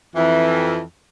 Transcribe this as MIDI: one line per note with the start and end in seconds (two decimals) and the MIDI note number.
0.16 0.79 41
0.16 0.79 52